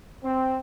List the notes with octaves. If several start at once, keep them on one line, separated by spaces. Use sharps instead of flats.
C4